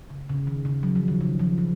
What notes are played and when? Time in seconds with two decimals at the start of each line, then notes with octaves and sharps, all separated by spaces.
0.10 C#3
0.29 C#3
0.47 D#3
0.65 C#3
0.83 F#3
0.95 F3
1.08 D#3
1.21 C#3
1.39 F3
1.58 F3